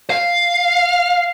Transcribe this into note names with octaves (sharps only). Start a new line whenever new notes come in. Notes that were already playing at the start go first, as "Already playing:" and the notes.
F5